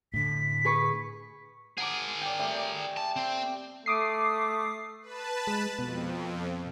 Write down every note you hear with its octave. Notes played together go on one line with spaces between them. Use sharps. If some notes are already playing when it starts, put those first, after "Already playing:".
A2 D3 B6
G#4 B4 C#6
G#4 A#4 F#5 D6
D5 G5
G3 A3 G5
A5
C4
A3 D6 D#6 C7
B4 A5
G#3
F2 B2